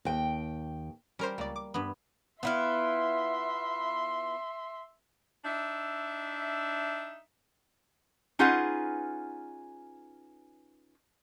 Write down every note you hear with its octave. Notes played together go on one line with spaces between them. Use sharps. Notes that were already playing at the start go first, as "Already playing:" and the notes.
D#2 G5
G3 C#4 A#4 C5
C#2 A#3 D5
D6
G2 B3
B3 E4 F4 E5 C6
D4 D#4 E5
C#4 D#4 F4 G#4 B4 F#5